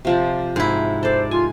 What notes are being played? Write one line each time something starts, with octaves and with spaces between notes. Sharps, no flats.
C3 F3 D5
G#2 E4
A4 C5 D5
F4 G#5